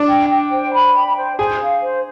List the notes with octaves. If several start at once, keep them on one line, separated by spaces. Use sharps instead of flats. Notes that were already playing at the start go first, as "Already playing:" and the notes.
Already playing: D4
G5
G5
C5
B5
G5
C5
G#4 C5
F5
C5